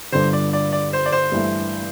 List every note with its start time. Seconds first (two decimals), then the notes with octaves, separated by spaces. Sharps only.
0.12 G1 G2 D3 C5
0.33 D5
0.53 D5
0.73 D5
0.93 C5
1.06 D5
1.12 C5
1.32 G2 E3 A3